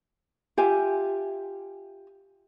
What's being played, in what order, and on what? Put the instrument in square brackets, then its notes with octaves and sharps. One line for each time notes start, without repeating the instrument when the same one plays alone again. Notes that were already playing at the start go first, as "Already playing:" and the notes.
[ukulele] F4 G4 E5 G#5